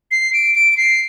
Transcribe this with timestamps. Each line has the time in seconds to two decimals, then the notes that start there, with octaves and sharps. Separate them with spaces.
0.11 C7
0.33 D7
0.55 D7
0.77 C7